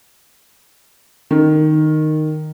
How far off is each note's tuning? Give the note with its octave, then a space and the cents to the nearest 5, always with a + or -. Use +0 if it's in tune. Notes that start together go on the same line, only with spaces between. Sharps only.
D#3 -10